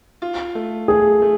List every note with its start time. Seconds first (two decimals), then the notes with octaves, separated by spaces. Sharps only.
0.22 F4
0.55 A3
0.88 A3 G#4
1.22 A3